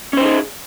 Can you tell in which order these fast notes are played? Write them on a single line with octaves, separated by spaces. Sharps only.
C#4 C5 D#4 G#4